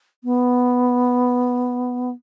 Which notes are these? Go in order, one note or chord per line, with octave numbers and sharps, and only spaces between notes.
B3